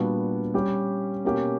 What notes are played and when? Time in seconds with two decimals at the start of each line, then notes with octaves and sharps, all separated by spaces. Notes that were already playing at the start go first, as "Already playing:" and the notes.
Already playing: A#2 G3 B3 D4 F#4
0.54 G3 C#4 G4
1.24 B2 A#3 C#4 G4